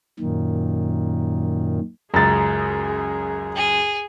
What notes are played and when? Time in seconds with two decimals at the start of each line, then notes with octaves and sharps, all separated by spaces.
0.19 F#2 A#2 D#3
2.14 C#2 F#2 G#4 A#5 A6
3.56 G#4